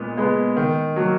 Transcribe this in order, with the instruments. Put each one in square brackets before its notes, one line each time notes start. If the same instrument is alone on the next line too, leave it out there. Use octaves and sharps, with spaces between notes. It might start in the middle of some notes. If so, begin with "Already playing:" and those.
Already playing: [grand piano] A#2 G#3 B3
G#3 B3
D#3
F#3 A#3